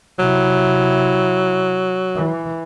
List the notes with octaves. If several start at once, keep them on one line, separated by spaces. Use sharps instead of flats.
C3 F#3 E4
E3